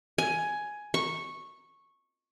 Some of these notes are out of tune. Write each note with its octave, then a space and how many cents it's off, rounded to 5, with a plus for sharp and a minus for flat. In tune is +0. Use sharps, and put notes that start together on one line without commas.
G#5 +10
C#6 -10